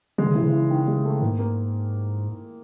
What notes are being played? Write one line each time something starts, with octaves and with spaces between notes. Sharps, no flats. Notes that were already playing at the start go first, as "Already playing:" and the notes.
D3 G#3
C#3
C3 E3
C#3
E3
D#3
G#3
A3
G#2 A#3
A#3